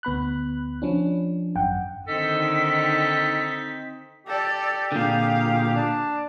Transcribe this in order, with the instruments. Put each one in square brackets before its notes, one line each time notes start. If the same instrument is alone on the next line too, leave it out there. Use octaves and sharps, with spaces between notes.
[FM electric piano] D2 B3 B5 F#6
F3 C#4 D4
G#1 F#2 F#5 G5
[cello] D3 D#3 [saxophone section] C4 D#4 [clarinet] A4 [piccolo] B6
[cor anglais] G4 [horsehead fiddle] A4 D5
[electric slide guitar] A#2 D3 [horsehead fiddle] G#4 F5
[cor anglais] D4